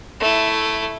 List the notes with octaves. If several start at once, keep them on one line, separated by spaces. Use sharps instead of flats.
A3 E4